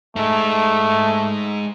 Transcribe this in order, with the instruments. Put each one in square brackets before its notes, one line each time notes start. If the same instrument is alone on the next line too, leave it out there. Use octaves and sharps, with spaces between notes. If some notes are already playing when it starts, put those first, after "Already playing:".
[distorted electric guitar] G#3 D#4 [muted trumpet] A3